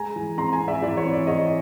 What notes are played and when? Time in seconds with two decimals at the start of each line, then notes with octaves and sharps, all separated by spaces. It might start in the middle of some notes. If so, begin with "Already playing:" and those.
Already playing: G#3 G#5 A#5
0.16 E3
0.37 C4 A#5 C6
0.53 G#5 A#5
0.60 C4
0.68 D5 E5
0.82 E3 D5
0.97 C#5
1.05 C4
1.13 D5
1.27 E3 C#5 D#5